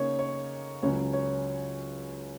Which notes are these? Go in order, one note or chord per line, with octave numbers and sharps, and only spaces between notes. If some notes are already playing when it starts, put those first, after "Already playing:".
Already playing: C#3 A#3 D#4 C#5
C#5
C#2 C#3 F#3 C#5
C#5